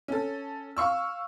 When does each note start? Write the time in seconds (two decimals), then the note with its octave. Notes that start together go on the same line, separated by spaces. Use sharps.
0.08 C#4 A4
0.77 F5 C#6 E6